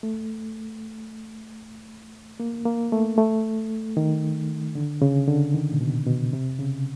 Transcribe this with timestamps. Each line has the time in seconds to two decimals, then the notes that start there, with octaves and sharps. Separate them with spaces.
0.03 A3
2.40 A#3
2.65 A#3
2.92 A3
3.18 A3
3.97 D#3
4.75 D3
5.02 C#3
5.28 D3
5.54 D#3
5.72 A#2
5.81 B2
6.07 B2
6.33 C3
6.59 C#3